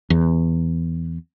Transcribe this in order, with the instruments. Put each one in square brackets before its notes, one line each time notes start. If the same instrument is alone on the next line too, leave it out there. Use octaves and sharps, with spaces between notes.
[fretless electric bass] E2